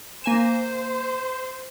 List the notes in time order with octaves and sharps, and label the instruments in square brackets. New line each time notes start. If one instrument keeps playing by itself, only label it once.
[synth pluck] A#3 G#5 E7 [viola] C5